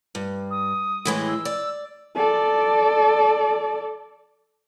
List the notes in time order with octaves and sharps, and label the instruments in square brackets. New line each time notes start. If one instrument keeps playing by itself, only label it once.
[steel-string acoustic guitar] G2
[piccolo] D#6
[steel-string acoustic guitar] A2 E3 G#3
[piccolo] E6
[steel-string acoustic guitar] D5
[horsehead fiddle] A4 D5